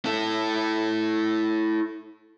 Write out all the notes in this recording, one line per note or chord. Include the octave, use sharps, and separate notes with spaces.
E4 A4